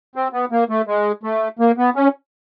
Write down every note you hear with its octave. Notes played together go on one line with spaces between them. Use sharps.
C4
B3
A#3
A3
G#3
A3
A#3
B3
C#4